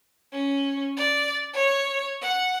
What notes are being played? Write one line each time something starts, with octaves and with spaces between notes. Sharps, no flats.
C#4
D5
C#5
F#5